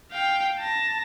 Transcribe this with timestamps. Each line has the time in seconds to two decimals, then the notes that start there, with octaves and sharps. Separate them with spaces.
0.11 F5 G5
0.59 A5 A#6